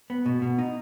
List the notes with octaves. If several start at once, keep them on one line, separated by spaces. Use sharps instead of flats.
B3
B2
B2
D#4